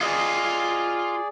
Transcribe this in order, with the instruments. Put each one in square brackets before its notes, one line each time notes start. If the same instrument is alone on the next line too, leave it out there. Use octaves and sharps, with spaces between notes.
[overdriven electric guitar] F4 D#5 [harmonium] G#4 D5